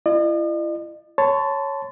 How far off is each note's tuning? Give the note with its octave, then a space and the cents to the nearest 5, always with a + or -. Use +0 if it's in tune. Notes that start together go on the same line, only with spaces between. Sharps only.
E4 +40 D#5 -45
C#5 +0 A5 +0 C6 -35